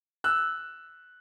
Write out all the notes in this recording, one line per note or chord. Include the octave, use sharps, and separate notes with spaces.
E6 F#6